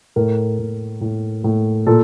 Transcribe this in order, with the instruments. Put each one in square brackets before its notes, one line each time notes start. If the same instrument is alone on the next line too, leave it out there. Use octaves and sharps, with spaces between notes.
[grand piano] A2 A#4
A2
A2
A2
A#2 A4